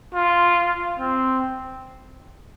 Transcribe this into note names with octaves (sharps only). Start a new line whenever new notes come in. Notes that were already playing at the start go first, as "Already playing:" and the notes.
F4
C4